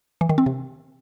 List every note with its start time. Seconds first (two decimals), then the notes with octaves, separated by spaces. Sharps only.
0.21 E3
0.29 D#3
0.38 C4
0.46 C3